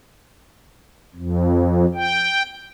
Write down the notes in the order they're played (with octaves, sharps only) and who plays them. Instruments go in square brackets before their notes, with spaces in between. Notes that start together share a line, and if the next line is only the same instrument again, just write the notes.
[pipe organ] F2
G5